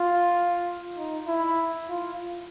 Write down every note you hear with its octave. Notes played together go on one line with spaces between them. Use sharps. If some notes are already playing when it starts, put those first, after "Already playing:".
Already playing: F4
D#4
E4
F4